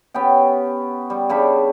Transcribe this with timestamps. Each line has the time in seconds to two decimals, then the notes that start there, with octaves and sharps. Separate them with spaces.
0.14 B3 C#4 G4 G5
1.10 G3
1.29 C#3 G3 D4 B5